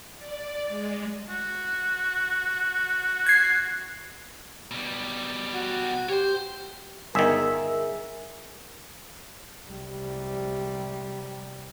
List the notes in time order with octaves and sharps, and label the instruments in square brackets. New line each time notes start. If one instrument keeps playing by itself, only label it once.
[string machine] D5
G#3
[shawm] F#4
[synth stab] G#6 C7
[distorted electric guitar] B2 G3
[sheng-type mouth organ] F#4
[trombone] G4 [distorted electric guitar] C5 C#5
[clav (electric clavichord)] G1 D#3 [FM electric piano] G#4 E5 [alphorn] A#4
[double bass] C2 G3